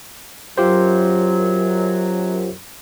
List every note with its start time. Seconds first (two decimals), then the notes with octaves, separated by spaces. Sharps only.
0.58 F#2 F#3 F4 G4 C5